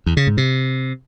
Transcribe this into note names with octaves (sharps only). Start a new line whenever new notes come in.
E2
C#3
G#2
C3